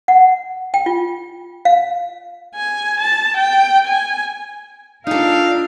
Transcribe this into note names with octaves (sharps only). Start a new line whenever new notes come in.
F#5
G5
F4
F5
G#5
A5
G5
G#5
D4 D#4 F4 A4 A#4 F5